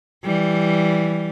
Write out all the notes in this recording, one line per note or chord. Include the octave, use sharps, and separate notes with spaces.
E3 G3